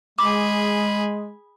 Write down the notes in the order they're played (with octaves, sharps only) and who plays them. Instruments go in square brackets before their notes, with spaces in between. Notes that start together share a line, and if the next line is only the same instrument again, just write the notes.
[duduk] G#3 [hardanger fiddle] G#4 B5 [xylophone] D6